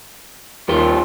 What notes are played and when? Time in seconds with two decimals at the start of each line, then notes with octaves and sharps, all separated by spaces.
0.68 D#2 F3 G3 C5